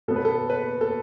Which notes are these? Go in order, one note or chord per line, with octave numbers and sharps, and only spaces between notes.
B2 B3 A4
B4
A4
B4
A4